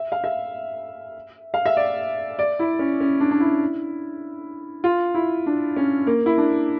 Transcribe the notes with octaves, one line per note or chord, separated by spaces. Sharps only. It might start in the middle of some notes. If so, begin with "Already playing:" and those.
Already playing: E5
F5
E5
F5
E5
D5
D5
E4
C#4
C#4
D4
D4
E4
F4
E4
D4
C#4
A#3
E4
D4